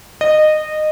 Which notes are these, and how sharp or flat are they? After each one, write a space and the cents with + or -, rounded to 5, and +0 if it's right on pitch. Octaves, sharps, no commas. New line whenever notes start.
D#5 -20